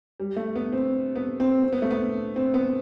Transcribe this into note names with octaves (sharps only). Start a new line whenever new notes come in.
G3
A3
B3
C4
B3
C4
C4
B3
A3
B3
C4
B3